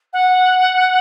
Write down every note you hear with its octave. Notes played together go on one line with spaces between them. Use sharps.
F#5